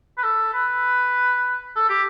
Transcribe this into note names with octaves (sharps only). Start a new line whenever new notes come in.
B4
A4
B4
A4
G4